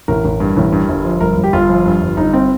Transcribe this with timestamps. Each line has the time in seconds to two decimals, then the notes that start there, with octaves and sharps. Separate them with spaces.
0.08 A1 A#4
0.25 A1
0.40 G2
0.57 A1
0.72 G2
0.89 G1
1.04 F3
1.21 G1 A#4
1.36 G1
1.44 G4
1.53 G1 F4
1.69 F3
1.85 G2
2.01 G1
2.17 G1 D#4
2.33 C4